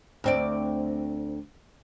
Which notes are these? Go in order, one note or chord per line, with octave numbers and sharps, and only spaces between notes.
D2 C4 D5